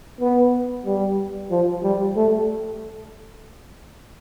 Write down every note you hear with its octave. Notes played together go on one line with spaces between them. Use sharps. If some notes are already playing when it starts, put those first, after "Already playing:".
B3
G3
F3
G3
A3